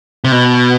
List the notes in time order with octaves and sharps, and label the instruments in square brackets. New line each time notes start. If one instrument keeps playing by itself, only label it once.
[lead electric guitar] C3
B2